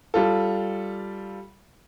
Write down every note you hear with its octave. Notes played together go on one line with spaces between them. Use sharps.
G3 F4 A4